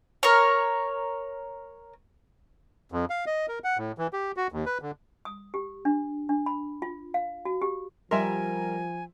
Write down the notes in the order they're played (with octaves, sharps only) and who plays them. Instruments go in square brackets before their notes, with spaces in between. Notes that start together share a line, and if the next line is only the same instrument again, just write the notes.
[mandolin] A#4 C#5
[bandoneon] F2
F5
D#5
A#4
F#5
A2
E3
G4
F#4
D#2
B4
D3
[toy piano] D#6
G4
D4
D4
B5
F4
F5
F#4
G4
[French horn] F3 [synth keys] G3 A#4 [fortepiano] E5 C6 [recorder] G#5